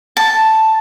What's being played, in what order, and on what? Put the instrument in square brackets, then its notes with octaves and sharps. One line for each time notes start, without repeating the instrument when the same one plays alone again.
[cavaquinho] A5